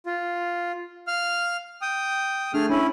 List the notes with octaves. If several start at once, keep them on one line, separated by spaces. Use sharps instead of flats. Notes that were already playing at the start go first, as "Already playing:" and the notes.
F4
F5 F6
G5 D#6
A3 D4 G#4 F6
C#4 D4 E4